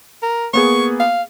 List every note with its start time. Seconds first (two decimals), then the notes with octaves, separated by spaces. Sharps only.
0.23 A#4
0.53 A#3 B3 G#4 C#6
1.00 F5